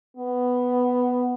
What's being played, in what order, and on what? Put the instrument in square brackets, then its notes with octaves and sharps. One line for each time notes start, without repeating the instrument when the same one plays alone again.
[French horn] B3